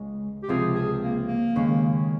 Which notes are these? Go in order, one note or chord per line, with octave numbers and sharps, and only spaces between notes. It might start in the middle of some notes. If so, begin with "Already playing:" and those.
Already playing: C#2 C#3 G#3
G4
C#2 C3 F3 C4 G#4
G#4
A#3
A#3
D#2 C#3 G#3